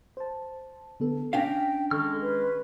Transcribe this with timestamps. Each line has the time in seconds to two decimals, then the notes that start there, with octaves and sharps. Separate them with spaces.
0.17 C5 A5
1.00 D3 B3 A4
1.33 C#4 D4 F5 G5 A#6 B6
1.91 D#3 G#3 A4 C#6 F6
2.21 B4